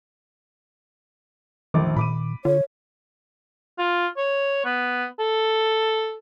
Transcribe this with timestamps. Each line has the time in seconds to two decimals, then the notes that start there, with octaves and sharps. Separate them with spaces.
1.74 F1 A#1 D#3 E3 D6
1.96 A#2 B5 D6 D#7
2.45 D3 F4 C#5
3.78 F4
4.17 C#5
4.65 B3
5.19 A4